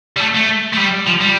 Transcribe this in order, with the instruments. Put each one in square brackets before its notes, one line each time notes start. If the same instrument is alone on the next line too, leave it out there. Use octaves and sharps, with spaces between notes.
[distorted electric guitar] G3
A3
A3
A3
G3
F3
G3